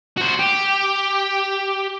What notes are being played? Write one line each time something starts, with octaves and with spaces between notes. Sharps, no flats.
F#4 C5
G4